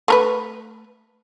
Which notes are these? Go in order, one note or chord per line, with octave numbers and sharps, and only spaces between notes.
A3 A#4 B4